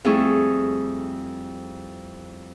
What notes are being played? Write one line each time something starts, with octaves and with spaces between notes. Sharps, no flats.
F2 G3 A3 E4 G#4 C#6